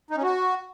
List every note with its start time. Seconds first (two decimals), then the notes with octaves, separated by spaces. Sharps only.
0.11 D#4
0.17 C#4
0.23 F#4